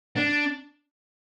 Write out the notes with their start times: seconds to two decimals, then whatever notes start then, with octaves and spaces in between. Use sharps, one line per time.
0.17 D4